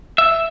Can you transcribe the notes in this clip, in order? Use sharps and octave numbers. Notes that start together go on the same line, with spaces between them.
E5